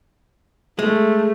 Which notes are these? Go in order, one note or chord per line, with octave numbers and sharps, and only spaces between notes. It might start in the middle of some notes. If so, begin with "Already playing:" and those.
G#3 A3